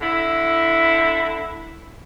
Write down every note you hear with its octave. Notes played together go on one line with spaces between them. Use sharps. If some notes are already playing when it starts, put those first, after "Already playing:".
D3 E4